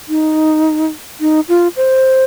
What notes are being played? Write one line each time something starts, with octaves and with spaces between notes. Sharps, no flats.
D#4
D#4
F4
C5